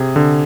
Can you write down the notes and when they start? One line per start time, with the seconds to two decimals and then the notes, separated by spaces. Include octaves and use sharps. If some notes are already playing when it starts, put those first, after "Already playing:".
Already playing: C3 G#4
0.16 D3